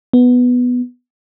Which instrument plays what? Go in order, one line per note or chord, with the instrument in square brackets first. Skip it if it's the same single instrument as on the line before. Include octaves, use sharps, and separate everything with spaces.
[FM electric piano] B3